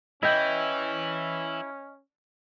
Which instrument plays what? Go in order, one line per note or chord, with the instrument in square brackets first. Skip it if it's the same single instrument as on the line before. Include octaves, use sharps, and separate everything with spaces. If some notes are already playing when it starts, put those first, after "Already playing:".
[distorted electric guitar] E3 [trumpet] C#4 [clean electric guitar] E4 G5 [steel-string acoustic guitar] D#5